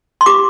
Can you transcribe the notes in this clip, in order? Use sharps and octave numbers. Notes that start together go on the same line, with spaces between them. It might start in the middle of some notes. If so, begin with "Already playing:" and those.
C6
G4 D6